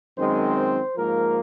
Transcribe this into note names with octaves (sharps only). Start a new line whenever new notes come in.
F#2 D#3 G#3 C4 C5
C5
G#2 F3 A#3 A#4